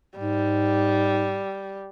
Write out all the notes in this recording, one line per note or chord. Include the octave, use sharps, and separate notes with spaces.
G#2 G3